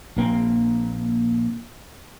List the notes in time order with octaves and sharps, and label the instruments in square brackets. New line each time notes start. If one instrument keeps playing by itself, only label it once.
[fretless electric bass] A#1 A#3 C4